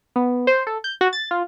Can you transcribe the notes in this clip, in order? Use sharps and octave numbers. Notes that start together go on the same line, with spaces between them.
B3
C5
A4
G6
F#4
A6
F4